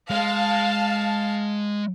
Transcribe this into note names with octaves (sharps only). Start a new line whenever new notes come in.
G#3 F5 A5